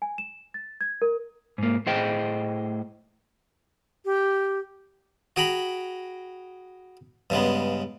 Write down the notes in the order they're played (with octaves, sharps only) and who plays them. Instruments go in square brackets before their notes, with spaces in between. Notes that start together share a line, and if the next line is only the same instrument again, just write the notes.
[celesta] G#5
E7
A6
G#6
A#4
[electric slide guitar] G#2 A#3
A2 A3 G#4 C5 D#5 G5
[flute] G4
[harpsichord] F#4 G#4 G5 A#5 B5
G2 C#3 G#3 B3